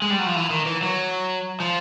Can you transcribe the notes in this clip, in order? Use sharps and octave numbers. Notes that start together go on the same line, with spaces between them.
G#3
G3
F#3
F3
E3
D#3
E3
F#3
F3